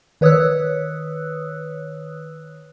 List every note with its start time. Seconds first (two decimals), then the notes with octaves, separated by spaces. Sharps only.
0.21 D#3 B4 C#5 D#6 E6 F#6